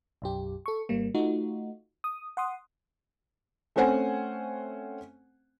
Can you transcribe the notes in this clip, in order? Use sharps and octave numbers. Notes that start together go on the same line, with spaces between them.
B1 F#2 G4
A4 C#6
G#1 G3 A#3
A3 D#4 F4 F#4
D#6
F#5 C6 D#6
A3 C4 C#4 C5 F#5 G#5